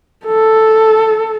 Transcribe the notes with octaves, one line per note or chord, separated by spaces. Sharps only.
A4